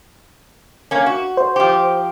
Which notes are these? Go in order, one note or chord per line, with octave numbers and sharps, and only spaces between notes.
A#3 C#4
F#4
C5
F3 G4